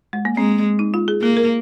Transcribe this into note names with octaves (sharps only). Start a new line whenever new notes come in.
G#3
A#3
G#3 C4
D#4
F4
G#4
A#3 G#4
A#4